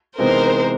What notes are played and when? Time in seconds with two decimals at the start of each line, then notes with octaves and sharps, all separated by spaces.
0.18 C3 E3 G#3 B3 D#4 A#4 C5